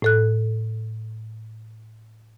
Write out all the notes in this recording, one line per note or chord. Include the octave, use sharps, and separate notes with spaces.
A2 A4 F#6